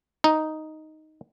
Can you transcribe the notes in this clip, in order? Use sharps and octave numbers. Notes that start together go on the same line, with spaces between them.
D#4